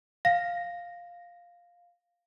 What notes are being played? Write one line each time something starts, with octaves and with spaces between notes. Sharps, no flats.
F5 A#6